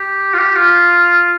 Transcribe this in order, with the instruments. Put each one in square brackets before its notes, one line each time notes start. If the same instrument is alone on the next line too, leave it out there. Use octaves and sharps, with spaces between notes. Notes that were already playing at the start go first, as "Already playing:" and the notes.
Already playing: [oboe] G4
F4
G4
F4